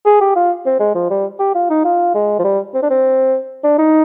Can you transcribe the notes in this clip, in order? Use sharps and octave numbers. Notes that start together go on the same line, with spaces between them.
G#4
G4
F4
C4
G#3
F3
G3
G4
F4
D#4
F4
G#3
F3
G3
C4
D4
C4
D4
D#4